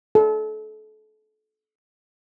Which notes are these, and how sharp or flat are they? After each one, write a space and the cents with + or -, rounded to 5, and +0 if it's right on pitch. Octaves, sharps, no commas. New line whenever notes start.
A4 -30